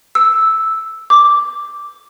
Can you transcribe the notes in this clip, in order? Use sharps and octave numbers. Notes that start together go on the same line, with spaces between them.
E6
D6